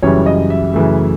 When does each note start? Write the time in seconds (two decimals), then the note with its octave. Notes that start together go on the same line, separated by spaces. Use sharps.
0.02 F#2 C#3 E3 G3 C#5
0.26 D#5
0.50 E5
0.74 F#2 C#3 E3 A3